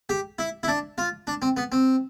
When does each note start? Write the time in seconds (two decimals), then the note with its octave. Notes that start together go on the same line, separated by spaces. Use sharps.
0.09 G4
0.39 E4
0.63 E4
0.68 D4
0.98 F4
1.27 D4
1.42 C4
1.57 B3
1.72 C4